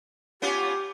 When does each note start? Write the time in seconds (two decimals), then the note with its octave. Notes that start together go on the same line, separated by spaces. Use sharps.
0.42 B3 C#4 F4 G4